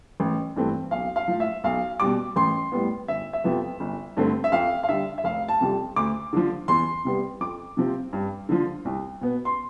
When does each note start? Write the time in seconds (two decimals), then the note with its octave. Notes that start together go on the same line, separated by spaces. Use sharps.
0.20 A1
0.56 G2 E3 A3 C4
0.91 B1 F5
1.16 F5
1.28 A2 F3
1.40 E5
1.64 B1 F5
2.00 B2 G3 D6
2.36 A1 C6
2.72 A2 G3 B3
3.08 G1 E5
3.33 E5
3.44 F2 C3 F3 B3
3.80 G1
4.17 G2 D3 A3 C4
4.44 E5
4.52 F2 F5
4.83 F5
4.89 D3 G3 E5
5.18 E5
5.24 F1 F5
5.48 A5
5.61 F2 C3 G3
5.96 D2 D6
6.33 D3 F3
6.68 E2 C6
7.05 C3 G3 B3
7.40 F2 D6
7.77 C3 F3 C4
8.13 G2
8.49 D3 F3
8.85 C2
9.21 B2 B3
9.45 C6